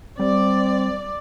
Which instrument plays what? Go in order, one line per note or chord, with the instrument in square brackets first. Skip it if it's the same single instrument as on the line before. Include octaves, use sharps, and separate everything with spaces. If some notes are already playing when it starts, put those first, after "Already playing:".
[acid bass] G3 [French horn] C4 [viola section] D5